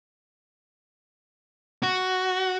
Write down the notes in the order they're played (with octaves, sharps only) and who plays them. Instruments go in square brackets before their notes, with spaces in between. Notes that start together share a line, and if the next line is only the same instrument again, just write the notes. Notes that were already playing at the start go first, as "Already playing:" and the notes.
[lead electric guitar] F#4